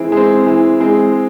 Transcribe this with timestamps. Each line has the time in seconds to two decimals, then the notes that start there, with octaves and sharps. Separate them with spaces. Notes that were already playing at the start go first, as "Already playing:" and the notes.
Already playing: E3 G#3 C4
0.12 G#3 C4
0.46 E3
0.80 G#3 C4